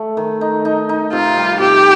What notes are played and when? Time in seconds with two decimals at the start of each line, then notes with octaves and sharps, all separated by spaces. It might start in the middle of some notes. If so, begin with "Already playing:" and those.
Already playing: A3
0.17 D#3
0.41 D#4
0.65 D#4
0.89 D#4
1.13 C3 F4
1.37 G3
1.60 C3 G4